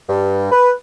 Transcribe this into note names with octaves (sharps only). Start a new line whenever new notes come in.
G2
B4